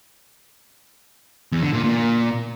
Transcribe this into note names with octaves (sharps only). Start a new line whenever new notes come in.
E2
D3
A#2
A#2